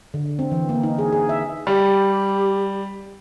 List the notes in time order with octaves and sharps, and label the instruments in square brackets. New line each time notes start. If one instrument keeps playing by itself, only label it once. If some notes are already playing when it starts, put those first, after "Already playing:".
[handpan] D3
C4
E3
A#3
D#4
G#4
G#4
E5
[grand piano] G3 [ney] G4